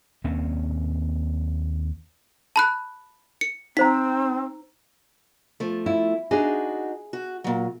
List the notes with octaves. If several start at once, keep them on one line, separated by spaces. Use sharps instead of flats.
D#2 A#3 C4 C#4
A5 B5 F#6
C#7
C4 D#4 C5 A#5 B6
F3 A3
E4
D4 D#4 F#4 G#4
F#4
A#2 F#3